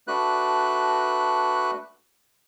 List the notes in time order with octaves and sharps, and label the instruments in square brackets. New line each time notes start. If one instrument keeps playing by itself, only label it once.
[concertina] A3 D4 F#4 B4 F#6